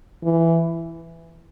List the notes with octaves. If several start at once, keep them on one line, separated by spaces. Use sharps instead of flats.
E3